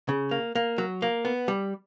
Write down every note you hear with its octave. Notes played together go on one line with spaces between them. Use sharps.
C#3
A#3
A#3
F#3
A#3
B3
G3